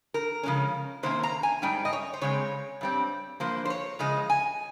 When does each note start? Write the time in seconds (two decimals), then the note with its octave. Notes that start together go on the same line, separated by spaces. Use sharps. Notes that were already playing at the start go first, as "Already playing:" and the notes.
0.14 A#4
0.43 C#3 F3 G#3 C#4
1.03 C3 D#3 A#3 C#4 C5
1.23 A#5
1.43 G#5
1.62 G#2 G3 C#4 G5
1.85 D#5
1.93 C#5
2.14 C5
2.21 C#3 G#3 C4 C#5
2.81 G2 G3 C4
3.40 G2 F3 A#3 C5
3.65 C5
3.70 C#5
3.99 C#3 F3 G#3 D#5
4.30 G#5